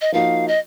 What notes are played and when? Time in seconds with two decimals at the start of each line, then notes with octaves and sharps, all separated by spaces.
0.01 D#5
0.12 F3 A#3 D#4 F#4 F5
0.48 D#5